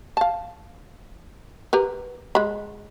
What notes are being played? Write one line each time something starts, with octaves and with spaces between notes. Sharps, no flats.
F5 A5
G4 A#4 B4
G#3 B5